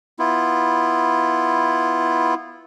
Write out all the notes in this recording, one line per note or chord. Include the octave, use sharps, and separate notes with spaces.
B3 E4 F4